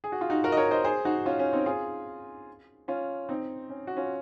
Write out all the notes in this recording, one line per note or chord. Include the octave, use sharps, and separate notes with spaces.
G#4
F#4
F4
D#4 F#4
F#4 A#4
D#5
A#4 C#5
C5 D#5
G#4 C5
D#4 F#4
C#4 F4
C#4
C4 D#4
F4 G#4
C#4 F4
C4 D#4
C#4
F#4
C#4 F4